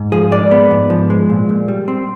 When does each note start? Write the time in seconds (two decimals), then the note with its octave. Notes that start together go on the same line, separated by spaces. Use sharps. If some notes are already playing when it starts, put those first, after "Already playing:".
Already playing: G#2
0.12 F3 G#4
0.32 G#3 D5
0.51 B3
0.71 G#2
0.90 F3
1.10 G#3
1.30 A#2
1.49 A#2
1.68 G3
1.88 C4